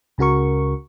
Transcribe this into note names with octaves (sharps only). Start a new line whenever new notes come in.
C#2 C#3 F#4 A#4 C#6